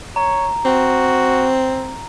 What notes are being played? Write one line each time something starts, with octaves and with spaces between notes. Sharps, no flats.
C#5 A#5
C4 F#4